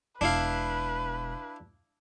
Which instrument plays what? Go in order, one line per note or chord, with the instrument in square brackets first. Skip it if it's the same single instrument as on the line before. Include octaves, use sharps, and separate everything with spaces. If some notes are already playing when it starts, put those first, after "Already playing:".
[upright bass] E1 B2 [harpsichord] D4 E4 F5 [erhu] B4